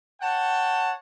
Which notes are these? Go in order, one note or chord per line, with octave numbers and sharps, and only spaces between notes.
C#5 F#5 G5 A5